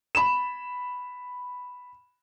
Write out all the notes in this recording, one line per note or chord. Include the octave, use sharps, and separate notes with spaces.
B5 E7